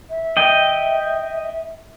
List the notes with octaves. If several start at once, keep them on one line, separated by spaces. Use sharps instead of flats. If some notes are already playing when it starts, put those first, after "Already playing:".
E5
D#5 G5